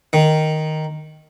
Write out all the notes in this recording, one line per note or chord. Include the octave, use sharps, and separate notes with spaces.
D#3